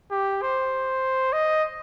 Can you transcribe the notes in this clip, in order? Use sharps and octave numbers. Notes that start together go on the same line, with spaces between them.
G4
C5
D#5